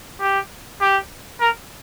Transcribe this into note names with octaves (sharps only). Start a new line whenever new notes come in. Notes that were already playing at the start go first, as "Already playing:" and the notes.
G4
G4
A#4